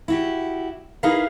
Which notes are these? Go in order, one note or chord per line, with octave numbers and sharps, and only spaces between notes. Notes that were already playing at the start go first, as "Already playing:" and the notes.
E4 F#4 G4
D#4 E4 G#4 A#4 B4 F5